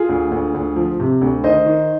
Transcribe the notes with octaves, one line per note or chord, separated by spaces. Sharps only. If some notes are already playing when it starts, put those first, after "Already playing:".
Already playing: F4 G#4
D2
D2
D2
F3
C3
D2
D#3 C5 D#5
D#3